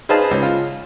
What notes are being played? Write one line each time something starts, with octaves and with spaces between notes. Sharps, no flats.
G#4 B4 C5 D#5 F5 A5
C#2
F4